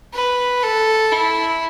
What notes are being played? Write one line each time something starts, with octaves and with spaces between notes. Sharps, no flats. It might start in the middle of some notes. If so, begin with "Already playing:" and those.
B4
A4
E4